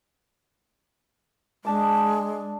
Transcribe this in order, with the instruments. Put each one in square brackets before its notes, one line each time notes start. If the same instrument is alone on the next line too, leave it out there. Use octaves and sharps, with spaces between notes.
[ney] G#3 [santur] D4 A5 D6